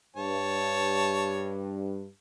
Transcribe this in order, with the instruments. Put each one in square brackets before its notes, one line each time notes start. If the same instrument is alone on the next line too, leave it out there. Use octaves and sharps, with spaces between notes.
[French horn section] G2 [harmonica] C#5 A5